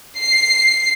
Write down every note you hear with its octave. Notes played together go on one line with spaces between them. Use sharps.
C7